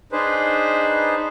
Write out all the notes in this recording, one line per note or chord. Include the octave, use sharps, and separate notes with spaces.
D4 D#4 G#4 B4 C5